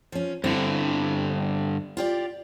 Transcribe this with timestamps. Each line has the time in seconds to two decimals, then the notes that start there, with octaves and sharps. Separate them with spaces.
0.12 F3 C#4
0.44 G2 D3 C4 E4
1.97 F4 G4 D5